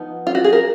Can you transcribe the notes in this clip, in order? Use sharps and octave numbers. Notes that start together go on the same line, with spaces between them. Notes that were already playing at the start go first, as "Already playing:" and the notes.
Already playing: F3 B3 D#4
F4
F#4
G#4
A#4